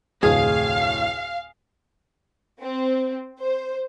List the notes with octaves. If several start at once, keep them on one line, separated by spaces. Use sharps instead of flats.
F1 D2 A2 G#4 F5
C4
C5